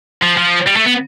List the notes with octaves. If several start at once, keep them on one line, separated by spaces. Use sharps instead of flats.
F3
F3
G3
A3
B3